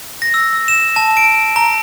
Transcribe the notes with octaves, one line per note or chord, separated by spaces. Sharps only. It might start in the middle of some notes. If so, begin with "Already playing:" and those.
A#6
E6
E7
A5
D7
A#5